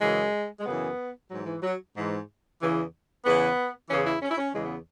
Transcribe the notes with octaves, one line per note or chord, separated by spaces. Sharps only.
F#2 C#3 E3 G#3
G#3
F#2 C#3 E3 B3
G#2 E3 F#3
E3
F#3
G#2 E3
E2 C#3 E3
E2 C#3 E3 B3
E2 C#3 E3 C#4
E4
C#4
E4
C#4
E2 C#3 E3 G#3
B3